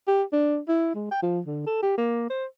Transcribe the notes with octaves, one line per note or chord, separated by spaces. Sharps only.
G4
D4
E4
G#3
G5
F3
D3
A4
G4
A#3
C5